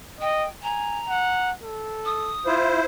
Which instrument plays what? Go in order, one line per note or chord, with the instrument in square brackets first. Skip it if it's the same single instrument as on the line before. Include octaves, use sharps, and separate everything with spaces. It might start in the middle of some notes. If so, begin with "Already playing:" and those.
[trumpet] D#5 [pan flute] G5
[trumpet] G#5 [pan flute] A#5
[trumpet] F#5
A4
[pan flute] D#6
[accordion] E4 C5 [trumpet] F4